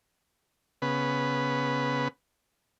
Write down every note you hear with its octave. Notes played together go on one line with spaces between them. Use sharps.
C#3 B3 B4